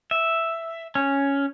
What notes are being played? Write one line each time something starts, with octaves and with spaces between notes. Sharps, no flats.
E5
C#4